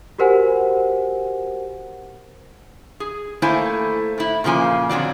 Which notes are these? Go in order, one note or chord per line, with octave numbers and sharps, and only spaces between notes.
F#4 G4 A#4 C5 F#5 G#5
G#4
A3 A#3 E4 A4 C5 G#5
A2 E4
A#2 C#3 F3 A#3 G#5
F2 D3 F#3 D5